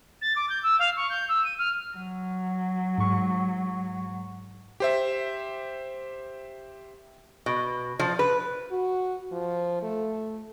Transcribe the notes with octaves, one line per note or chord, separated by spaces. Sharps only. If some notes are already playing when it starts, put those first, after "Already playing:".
A6
D6
G6
E6
F5
C#6
G6
E6
D#7
F6
F#3
G#2 C#6
G4 C5 E5
B2
F3
B4
F#4
F3
A3